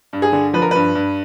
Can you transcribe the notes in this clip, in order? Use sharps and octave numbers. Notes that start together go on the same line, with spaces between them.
G2
G#4
D3
F3 B4
A#4
G2 B4
G2